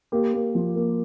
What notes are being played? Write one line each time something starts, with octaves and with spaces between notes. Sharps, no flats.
A#3 G4
A#3
F3
A#3